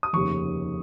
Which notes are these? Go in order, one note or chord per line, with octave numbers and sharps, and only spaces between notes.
D#6
F1 D#2 C#3 C#6